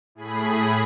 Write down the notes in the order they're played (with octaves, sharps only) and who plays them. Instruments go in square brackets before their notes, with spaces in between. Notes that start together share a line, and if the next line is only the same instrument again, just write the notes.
[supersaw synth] A2 G#4 B5